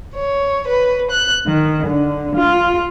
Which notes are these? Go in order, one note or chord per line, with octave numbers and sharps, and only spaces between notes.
C#5
B4
F#6
D#3
D3
F4